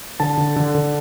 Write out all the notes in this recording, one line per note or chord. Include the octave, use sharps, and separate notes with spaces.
D3 A5
D3
D3
D3